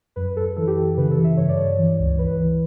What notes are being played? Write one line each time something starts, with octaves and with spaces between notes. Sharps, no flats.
F#2 B4
F#2 A4
E3 A4
G4
E3 A4
C#3 B4
A4
E3
E5
G2 C#5
D5
G2 C#5
E3
C#2
E3 B4
E3